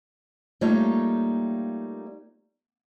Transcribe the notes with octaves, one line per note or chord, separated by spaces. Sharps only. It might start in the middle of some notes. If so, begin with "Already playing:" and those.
G3 A3 A#3 D#4 F4 C#5